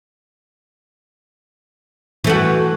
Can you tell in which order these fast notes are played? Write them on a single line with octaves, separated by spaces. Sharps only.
E3 A3 F#4